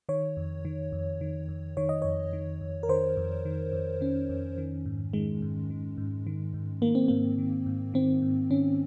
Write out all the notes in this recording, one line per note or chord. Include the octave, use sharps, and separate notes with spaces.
D#3 C#5
F2
D#3
F2
D#3
F2
D#3 C#5
D#5
F2 C#5
D#3
F2
A#4
D#3 C5
F2
D#3
F2
D#3 C#4
F2
D#3
G#2
D#3 G#3
G#2
D#3
G#2
D#3
G#2
D#3 A#3
C4
G#2 A#3
D#3
G#2
D#3 C4
G#2
D#3 C#4